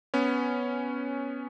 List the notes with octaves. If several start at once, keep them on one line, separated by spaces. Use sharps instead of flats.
B3 C#4